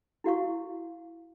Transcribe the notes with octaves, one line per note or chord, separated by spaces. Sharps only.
E4 F#4 F5 C#6